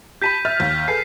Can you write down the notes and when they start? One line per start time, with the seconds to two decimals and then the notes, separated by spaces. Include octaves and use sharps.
0.22 G4 A5 B5 G6 B6 D#7
0.45 E5 F6 A6
0.60 D#2 G6
0.88 G#4 A4 B4 G6 C7